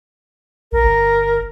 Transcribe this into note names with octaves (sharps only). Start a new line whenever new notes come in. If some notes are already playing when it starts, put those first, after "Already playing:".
B1 A#4
G1